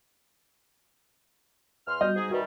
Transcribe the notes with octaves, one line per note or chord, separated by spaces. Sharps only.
E2 C6 F6
G3 F#4 D#5 G6
G#2 G#4
D#3 E3 G3 F#4 B4